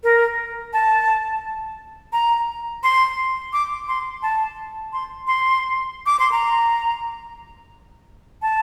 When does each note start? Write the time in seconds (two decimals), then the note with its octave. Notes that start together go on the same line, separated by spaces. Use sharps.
0.04 A#4
0.73 A5
2.13 A#5
2.83 C6
3.53 D6
3.88 C6
4.23 A5
4.93 C6
5.27 C6
6.06 D6
6.20 C6
6.32 A#5
8.42 A5